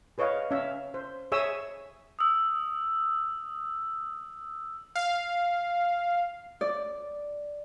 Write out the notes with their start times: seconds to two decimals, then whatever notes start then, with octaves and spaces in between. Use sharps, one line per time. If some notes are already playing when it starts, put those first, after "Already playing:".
0.18 G#4 B4 C#5 D#5 F5
0.51 C#4 E5 F5
0.94 C5
1.32 G#4 C#5 E5 G#5 D#6 E6
2.19 D#6 E6
4.96 F5
6.61 D5